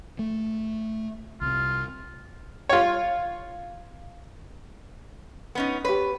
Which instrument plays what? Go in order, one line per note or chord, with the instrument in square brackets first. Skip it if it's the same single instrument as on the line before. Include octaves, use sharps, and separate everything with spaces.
[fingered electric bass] A3
[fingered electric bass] C2 C3 [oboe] F4
[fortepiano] F4 C#5
[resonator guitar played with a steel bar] B3 C#4 D#4
[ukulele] G4 C#5 [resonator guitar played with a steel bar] B4